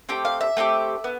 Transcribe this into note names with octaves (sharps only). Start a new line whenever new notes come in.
A3 C4 G4 G5
F5
E5
A3 C4 D#4 G4
B3